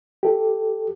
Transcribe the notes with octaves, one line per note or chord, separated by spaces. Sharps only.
G4 A4